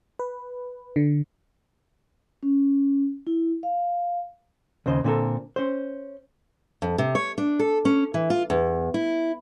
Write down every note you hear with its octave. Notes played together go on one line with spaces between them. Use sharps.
B4
D3
C#4
E4
F5
D#2 C#3 C5 D#5
A#2 D3 C4 F4 A4 A#4
C#4 C5
F2
C3
C#5
D4
A4
C#4
E3
F4
E2
E4